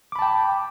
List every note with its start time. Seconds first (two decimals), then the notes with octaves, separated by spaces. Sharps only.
0.12 D6
0.16 B5
0.19 A5
0.22 G5